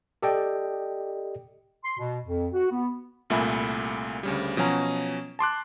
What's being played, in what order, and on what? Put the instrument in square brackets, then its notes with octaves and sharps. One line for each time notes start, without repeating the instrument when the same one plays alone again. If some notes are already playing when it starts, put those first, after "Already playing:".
[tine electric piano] G4 A4 D5 D#5 G5
[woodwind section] C6
B2
F2
F#4
B3
[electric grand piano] C2 A#2 A3 E5 G#5 B5
D2 C#3 G3
B2 F3 F#3 C#4 G#5 A#5
A5 C6 D6 F#6